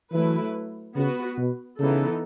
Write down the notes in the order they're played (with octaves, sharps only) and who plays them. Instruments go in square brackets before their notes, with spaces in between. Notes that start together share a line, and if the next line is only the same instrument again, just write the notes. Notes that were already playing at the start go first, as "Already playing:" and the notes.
[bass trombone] E3 [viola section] F#3 A3 E4 B4
[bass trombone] C#3 [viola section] B3 F#4 B4
[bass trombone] B2
[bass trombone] C#3 [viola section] E3 B3 D#4 A4